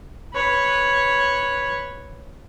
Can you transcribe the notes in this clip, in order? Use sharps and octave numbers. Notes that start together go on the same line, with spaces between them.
B4 C#5